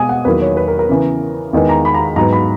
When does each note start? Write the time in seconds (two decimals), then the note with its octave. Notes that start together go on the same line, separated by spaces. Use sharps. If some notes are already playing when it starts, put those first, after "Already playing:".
Already playing: B2 G#3 G#5 D#6
0.09 F#5
0.25 E2 D#3 F#3 A#3 B4
0.42 C#5
0.57 B4
0.68 A#4
0.79 A#4
0.89 C#3 E3 B3
1.53 E2 D#3 G#3 B3
1.69 A#5
1.85 B5
1.94 A#5
2.16 G#2 F#3 B3 A#5
2.33 B5